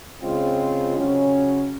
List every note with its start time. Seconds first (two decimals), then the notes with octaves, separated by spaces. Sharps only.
0.22 C#3 G#3 C4 F4
0.97 C#3 F#3 C#4